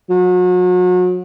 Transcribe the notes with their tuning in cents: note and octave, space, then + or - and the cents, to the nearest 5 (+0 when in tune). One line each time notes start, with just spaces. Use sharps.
F#3 -35